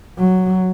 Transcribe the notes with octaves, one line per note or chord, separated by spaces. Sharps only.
F#3